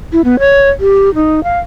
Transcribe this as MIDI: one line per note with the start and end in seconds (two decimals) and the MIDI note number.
0.13 0.21 64
0.25 0.39 59
0.39 0.69 73
0.80 1.13 67
1.15 1.43 63
1.44 1.58 77